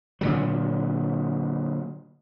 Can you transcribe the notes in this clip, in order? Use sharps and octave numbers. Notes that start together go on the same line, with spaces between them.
A#2 D3 F#3